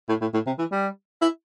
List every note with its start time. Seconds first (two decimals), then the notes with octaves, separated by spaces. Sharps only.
0.09 A2
0.21 A2
0.34 A2
0.46 C3
0.59 E3
0.72 G3
1.22 E4